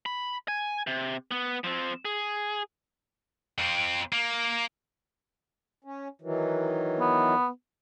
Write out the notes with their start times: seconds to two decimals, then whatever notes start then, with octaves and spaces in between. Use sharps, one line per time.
0.06 B5
0.48 G#5
0.87 C3
1.31 B3
1.64 F3 C4
2.05 G#4
3.59 F2 C4
4.12 A#3
5.84 C#4
6.21 D#3 E3 F#3
7.00 B3